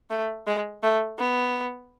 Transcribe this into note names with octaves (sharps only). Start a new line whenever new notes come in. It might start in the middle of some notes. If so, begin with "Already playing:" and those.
A3
G#3
A3
B3